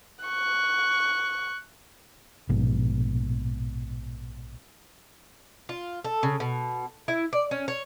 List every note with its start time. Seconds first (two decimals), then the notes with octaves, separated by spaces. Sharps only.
0.25 C#6 F#6
2.49 A#1 G#2 B2
5.69 F4
6.04 A4
6.23 C#3
6.40 B2
7.08 E4
7.33 D5
7.51 C#4
7.68 C#5